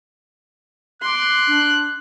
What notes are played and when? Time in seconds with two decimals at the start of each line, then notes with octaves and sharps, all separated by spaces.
1.02 C6 D6 F#6
1.48 D4